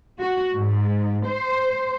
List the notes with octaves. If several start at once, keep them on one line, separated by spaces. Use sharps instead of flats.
F#4
G#2
C5